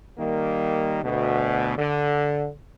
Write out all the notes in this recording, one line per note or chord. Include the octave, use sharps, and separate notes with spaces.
D#3 G3 A#3
D2 B2
D3